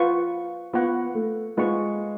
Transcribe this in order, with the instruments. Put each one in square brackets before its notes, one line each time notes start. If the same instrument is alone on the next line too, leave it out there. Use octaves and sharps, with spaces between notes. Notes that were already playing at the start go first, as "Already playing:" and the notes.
Already playing: [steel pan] F4 B4 F#5 C#6
[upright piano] B3 [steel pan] F4 B4 F#5 C#6
[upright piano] A3
[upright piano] G#3 [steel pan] F4 B4 F#5 C#6